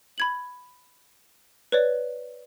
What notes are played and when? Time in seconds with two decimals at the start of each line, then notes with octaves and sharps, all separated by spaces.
0.18 B5 G#6 F#7
1.72 B4 C#5 D5